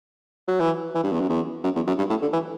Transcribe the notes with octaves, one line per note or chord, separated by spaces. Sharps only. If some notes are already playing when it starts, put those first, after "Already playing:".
F#3
E3
E3
G2
E2
F#2
E2
F#2
E2
F#2
G2
A2
D3
E3